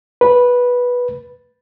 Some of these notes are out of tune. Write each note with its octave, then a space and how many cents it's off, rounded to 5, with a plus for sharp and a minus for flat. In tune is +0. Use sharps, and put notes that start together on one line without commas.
B4 -10